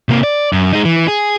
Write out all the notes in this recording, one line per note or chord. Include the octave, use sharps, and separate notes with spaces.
C3 A#3
D5
F#2
G#3 D#4
E3
G#4